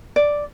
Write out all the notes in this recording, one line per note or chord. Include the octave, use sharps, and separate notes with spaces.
D5